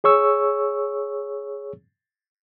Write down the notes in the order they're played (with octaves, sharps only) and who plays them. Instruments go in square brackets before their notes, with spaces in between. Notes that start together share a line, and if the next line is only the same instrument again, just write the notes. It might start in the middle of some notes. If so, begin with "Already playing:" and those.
[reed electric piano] G#4 C#5 C#6 E6